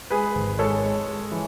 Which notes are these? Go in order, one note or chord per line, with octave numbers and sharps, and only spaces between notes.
G#3 G#4 B4
G#1
G#3 A4 C#5
G#3
G#3
E3